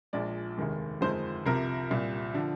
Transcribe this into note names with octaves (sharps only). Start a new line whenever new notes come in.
A#1 A#2 F3 G#3 D5
F1 D#2 D#3 G#3
G1 F2 D#3 G#3 C5
C2 C3 F3 A#4
C2 A#2 G3
D3 F3